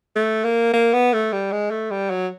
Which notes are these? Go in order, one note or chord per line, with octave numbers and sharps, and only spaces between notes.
A3
A#3
A#3
B3
A3
G3
G#3
A3
G3
F#3